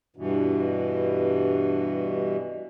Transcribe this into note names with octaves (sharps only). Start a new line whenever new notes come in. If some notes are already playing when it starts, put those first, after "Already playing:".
G2 B2 E3